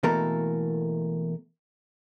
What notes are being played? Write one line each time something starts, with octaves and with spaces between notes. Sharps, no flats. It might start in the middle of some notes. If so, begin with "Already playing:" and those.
B2 E3 A3 A#3 A4 A#4